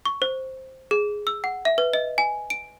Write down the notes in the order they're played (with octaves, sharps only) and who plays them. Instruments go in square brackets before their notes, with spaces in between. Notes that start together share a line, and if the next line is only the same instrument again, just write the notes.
[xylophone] C#6
C5
G#4
E6
F#5
E5
B4
D#5
G#5
D7